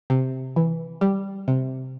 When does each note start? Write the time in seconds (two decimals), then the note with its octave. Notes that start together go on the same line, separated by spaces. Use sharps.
0.10 C3
0.56 E3
1.01 G3
1.48 C3